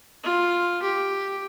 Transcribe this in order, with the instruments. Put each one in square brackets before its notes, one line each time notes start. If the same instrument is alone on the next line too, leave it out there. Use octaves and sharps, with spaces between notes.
[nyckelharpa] F4
G4